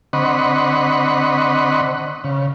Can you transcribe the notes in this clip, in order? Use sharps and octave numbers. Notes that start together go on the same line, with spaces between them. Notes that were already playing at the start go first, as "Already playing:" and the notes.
D3 C4 D#5 F#5 B5 C#6
C#3